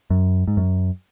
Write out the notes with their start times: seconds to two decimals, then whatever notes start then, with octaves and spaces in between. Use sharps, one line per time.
0.10 F#2
0.47 G#2
0.57 F#2